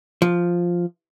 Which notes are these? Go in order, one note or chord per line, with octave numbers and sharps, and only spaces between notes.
F3